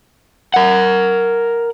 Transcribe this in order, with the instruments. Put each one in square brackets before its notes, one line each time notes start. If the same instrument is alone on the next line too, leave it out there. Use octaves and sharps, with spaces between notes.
[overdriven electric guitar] A#4 F#5